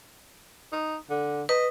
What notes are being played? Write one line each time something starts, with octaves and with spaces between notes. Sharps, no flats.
D#4
D3
B4 D#5